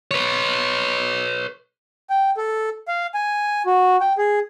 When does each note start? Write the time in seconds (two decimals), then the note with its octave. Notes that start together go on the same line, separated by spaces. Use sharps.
0.11 B4 C#5
2.10 G5
2.37 A4
2.88 F5
3.14 G#5
3.66 F#4
4.01 G5
4.18 G#4